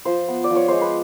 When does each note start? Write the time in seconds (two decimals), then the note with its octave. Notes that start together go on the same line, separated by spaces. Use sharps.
0.05 F3 C5
0.28 B3
0.44 D5
0.51 F3
0.56 C#5
0.68 G#3 C5
0.81 B4